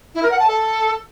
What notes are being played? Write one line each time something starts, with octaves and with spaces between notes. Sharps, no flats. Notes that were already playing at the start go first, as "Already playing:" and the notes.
E4
A#4
F#5
A5
A4